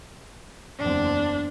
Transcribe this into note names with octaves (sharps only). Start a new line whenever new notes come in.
F#1 E2 C4 D4